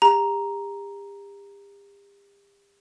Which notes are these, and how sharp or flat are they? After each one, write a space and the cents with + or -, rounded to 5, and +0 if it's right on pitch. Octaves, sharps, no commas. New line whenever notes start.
G4 +40 A#5 +5